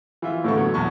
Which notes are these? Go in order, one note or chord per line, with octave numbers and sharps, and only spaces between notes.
E3 F4 E5
A2 D3 B3 A4 C#6
F#3
A#1 E2 A5 C#6